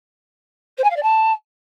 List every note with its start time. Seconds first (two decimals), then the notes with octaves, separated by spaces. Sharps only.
0.77 C5
0.84 G#5
0.90 F5
0.96 D5
1.02 A5